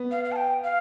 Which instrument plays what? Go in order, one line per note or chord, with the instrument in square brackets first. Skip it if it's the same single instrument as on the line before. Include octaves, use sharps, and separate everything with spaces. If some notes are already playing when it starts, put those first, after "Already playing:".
Already playing: [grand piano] B3
[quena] F5
F5
A5
G5
F5